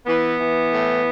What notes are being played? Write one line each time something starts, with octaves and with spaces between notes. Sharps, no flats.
E3 B3
E3
A2